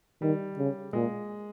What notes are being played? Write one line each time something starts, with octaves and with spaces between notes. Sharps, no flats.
D#3 G3
C#3
A#2 G#3